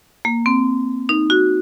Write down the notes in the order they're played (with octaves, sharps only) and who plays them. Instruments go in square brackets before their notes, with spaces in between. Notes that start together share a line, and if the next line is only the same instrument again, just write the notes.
[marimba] A#3
C4
D#4
F#4